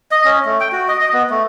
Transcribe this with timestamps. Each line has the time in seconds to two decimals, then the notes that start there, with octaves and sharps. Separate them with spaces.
0.11 D#5
0.25 C#4
0.45 A3
0.60 G5
0.72 F#4
0.88 D#5
1.01 D#5
1.13 B3
1.30 A3